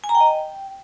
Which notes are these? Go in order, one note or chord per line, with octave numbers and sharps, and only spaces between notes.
G#5
A#5
G5
D#5
G5